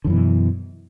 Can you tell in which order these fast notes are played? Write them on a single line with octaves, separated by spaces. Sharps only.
D3 F#2 E3 B2